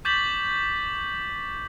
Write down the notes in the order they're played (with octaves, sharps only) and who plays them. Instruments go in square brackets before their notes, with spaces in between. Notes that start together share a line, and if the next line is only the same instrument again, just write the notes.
[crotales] C#6 D6 G6 A6 B6 F#7